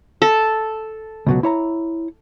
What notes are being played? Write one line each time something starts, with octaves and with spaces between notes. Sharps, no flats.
A4
C#2 B2 F#3
E4 C#5 A#5